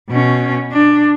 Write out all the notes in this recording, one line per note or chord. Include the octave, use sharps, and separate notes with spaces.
B2 C#4
D4